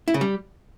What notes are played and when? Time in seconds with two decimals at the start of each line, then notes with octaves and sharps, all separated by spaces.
0.08 E4
0.14 C#3
0.21 G3